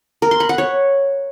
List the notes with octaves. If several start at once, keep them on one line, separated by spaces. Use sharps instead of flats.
A#4
C6
B5
F#5
C#5